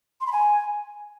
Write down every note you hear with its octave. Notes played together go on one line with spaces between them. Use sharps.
C6
B5
G#5